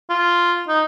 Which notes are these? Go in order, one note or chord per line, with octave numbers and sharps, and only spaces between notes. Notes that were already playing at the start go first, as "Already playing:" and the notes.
F4
D#4